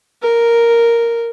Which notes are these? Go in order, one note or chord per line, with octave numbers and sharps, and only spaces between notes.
A#4